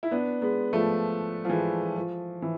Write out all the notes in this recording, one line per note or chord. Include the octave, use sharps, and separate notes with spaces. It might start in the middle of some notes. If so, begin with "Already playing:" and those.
E4
B3 D4
G#3 B3
F3 A3
F3
E3 G#3
F3
E3